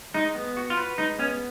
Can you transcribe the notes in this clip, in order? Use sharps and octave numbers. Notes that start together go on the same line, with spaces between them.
G#3 D#4
B3
F#4
F4
B4
G#3 D#4
B3 C#4